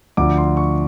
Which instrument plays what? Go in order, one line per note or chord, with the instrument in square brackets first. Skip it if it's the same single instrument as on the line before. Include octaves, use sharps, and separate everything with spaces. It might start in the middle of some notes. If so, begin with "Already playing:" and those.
[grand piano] D2 D3 F3 D6
C6
C#6